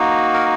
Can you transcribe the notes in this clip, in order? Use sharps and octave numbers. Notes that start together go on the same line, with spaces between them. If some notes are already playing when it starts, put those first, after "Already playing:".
Already playing: A#3 D#4 F#4
A#4